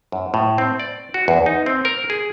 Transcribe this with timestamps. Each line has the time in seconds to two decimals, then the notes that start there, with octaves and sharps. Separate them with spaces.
0.12 F#2
0.34 A2
0.58 C4
0.80 D5
1.14 F#4
1.28 E2
1.46 D#4
1.66 C4
1.85 A#4
2.10 G#4